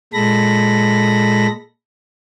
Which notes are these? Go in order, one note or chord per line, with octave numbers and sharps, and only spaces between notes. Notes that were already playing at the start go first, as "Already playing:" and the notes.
A#2 G#3 A4 B5 A#6